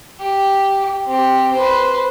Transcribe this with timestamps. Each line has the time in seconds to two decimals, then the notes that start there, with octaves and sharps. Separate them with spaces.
0.20 G4
1.06 C4 G4
1.52 B4 C5